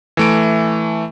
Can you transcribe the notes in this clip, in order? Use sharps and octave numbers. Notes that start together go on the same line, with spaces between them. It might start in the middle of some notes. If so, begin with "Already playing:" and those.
E3 A3 D7